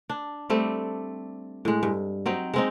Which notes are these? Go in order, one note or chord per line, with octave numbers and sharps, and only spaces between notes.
D4
G3 A3 C4
A2 G#3
G2
F#3 C4 D#4
G#3 C4 D#4